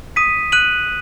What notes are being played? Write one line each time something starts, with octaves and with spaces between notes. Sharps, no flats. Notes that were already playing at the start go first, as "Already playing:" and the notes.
D#6 B6 D#7
F#6 D#7 F#7